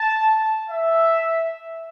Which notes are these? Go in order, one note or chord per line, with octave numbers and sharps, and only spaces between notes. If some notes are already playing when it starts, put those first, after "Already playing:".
Already playing: A5
E5